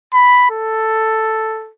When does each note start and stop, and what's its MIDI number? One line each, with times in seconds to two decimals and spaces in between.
0.14 0.47 83
0.51 1.71 69